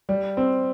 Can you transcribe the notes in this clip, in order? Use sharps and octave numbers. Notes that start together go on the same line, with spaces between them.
G3
C4